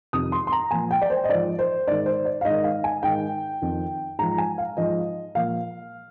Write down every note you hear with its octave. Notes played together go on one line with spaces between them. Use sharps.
F2 C3 D#3 D#6
C6
C6
A#5
A#2 F3 G#5
G5
D5
C5
D#5
G#2 F3 D5
C5
G#2 D#3 D5
C5
D5
F5
G#2 D#5
D#3
F5
G#5
G#2 D#3 G5
F2 D#3
G#2 F3 A#5
G#5
F5
G#2 F3 D#5
A#2 F3 F5